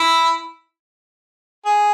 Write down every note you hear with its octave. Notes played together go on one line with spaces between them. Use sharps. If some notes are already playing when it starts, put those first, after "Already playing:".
Already playing: E4
G#4